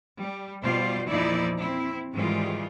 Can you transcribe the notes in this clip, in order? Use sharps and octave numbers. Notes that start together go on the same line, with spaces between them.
G3
B2 G3 F4 C5 D5
E2 A#2 F3 D#4 E4 D5
C4 E4
G#2 D#3 E3 G3 G#3 F4